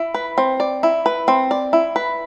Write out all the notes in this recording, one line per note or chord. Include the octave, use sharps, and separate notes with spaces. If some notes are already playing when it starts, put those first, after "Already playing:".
Already playing: E4
B4
C4
D5
E4
B4
C4
D5
E4
B4